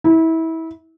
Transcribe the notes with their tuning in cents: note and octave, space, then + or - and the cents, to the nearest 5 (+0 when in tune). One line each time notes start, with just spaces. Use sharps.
E4 -25